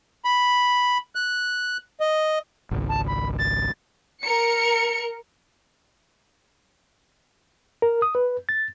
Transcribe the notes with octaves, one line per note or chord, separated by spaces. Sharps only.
B5
F#6
D#5
G#1 C#2
A5
B5
A6
A#4 C#7
A#4
D#6
B4
A6